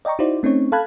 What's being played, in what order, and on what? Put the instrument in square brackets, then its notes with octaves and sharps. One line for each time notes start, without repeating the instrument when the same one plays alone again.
[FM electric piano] D5 D#5 G5 A#5 C#6
D#4 E4 F#4 C5 D5
A3 C4 C#4 D#4 C#5
A4 F5 A5 B5 F#6 G#6